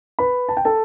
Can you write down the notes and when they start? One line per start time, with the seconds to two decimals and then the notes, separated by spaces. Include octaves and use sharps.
0.19 B4 B5
0.49 A5
0.57 G5
0.65 A4 A5